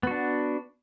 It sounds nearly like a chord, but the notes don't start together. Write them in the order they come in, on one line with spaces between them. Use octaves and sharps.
B3 F#4 D4